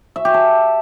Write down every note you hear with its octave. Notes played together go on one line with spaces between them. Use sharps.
E5
G4
A5